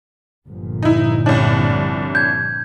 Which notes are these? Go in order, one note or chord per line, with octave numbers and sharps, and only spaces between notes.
G1 A#2 F3
D#4 E4
C2 C#4 D4
G6 G#6